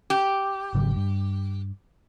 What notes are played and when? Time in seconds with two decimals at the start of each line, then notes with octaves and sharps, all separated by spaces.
0.10 G4
0.74 G#1 C#3 F#3
0.96 G2